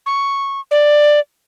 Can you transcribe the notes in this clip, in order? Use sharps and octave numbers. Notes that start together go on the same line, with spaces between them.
C#6
D5